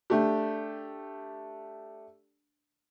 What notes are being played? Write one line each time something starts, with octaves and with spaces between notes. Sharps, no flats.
A3 D4 G4